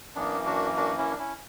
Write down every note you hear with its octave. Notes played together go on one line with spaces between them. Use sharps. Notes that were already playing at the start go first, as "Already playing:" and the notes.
F#2 E3 A#3 B3 D4
D4 F#4
D4 F#4
C#4 E4
D4
C#4 E4